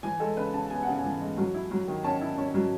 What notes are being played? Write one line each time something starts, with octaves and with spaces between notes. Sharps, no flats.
E3 G#5
G#3 A4
C#3 B4
C#3 A5
B3 G#5
C#3 F#5
G#5
E3
G#3
F#3
E4
F#3
D#3
C#4 A5
E4
C#4
F#3